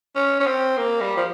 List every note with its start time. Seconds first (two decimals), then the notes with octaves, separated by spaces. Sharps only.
0.15 C#4
0.40 C#4
0.46 C4
0.77 A#3
1.01 G3
1.17 F3